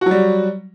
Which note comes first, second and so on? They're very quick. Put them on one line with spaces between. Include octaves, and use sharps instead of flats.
F#4 F#3 G3